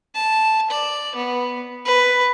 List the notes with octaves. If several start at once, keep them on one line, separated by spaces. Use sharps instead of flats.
A5
D5
B3
B4